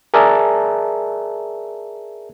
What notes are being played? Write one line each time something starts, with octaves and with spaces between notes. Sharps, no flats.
G#4 A#4 D5 E5 A5